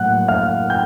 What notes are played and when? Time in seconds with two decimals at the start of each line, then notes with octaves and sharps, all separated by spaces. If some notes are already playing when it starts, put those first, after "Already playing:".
Already playing: A2 F#3 A#3 F#5 F#6
0.28 F5 F6
0.70 G5 G6